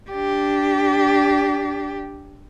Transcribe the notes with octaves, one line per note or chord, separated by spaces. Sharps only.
D4 G4